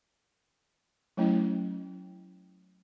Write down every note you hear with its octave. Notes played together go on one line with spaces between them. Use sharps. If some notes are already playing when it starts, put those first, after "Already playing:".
F#3 A3 C#4 E4